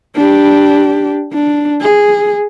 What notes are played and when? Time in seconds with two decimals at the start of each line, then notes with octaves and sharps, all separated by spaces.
0.16 D4 G4
1.33 D4
1.81 G#4